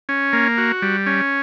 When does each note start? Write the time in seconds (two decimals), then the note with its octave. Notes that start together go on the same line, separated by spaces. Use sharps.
0.09 C#4
0.33 A#3
0.58 F#4
0.82 G3
1.06 C#4